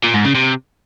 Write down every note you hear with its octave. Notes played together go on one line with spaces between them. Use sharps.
A#2
G#2
C#3
C3